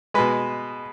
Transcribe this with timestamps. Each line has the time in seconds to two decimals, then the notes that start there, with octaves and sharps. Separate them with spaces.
0.14 B2 G#3 B4